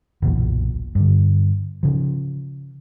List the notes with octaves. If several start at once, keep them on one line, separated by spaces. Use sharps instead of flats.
F#1 B1 E2 A#2
G2 D3
C#3 F3